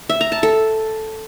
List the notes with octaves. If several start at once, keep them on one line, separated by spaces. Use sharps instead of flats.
E5
A#5
A5
A4